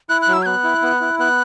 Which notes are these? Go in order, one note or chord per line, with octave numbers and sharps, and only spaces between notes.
E4 F#6
F#6
F#3
E6
G#6
B3 F#6
E4
B3
E4
B3 F#6